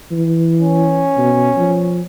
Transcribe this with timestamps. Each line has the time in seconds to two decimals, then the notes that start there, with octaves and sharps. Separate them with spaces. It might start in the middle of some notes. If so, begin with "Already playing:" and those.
0.12 E3
0.62 C#4
1.18 B2
1.58 F3